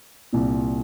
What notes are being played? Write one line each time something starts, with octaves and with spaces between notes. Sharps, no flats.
C2 A#2